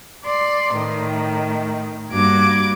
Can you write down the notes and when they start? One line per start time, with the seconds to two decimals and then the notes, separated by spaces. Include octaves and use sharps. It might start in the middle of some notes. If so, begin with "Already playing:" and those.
0.24 D5 C6
0.74 A2 D#3
2.11 G2 A#3 F#4 D6 G#6